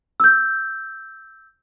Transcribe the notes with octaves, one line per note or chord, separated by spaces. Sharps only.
E6 G6